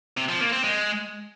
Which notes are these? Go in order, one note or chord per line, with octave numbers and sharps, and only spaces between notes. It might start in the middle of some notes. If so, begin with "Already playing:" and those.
C3
F3
A#3
C4
G#3